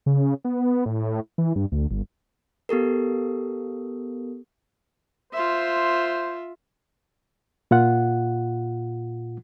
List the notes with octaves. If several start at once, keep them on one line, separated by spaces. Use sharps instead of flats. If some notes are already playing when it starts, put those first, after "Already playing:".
C#3
B3
A2
E3
G2
D2
G1
B3 G4 A4 A#4
F4 C5 E5
A#2 F4 F#5